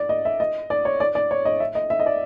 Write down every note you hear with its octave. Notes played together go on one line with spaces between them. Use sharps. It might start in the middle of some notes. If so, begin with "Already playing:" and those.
Already playing: D5
D#5
E5
D#5
D5
C#5
D5
D5
C#5
D#5
E5
D#5
E5
D#5
D5